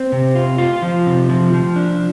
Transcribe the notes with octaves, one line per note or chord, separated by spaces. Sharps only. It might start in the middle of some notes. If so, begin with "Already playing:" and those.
Already playing: C4
C3
F4
F4
F3
C3
F3
F3
D4